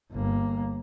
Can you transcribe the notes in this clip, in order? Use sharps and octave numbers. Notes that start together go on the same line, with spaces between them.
G1 A#3